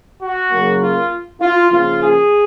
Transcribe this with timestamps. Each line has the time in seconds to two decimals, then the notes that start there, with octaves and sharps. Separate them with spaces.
0.21 F#4
0.51 C#3 F#3 A#3
0.81 F4
1.41 F4
1.71 C#3 F3 A#3 C#4 F4
2.01 G#4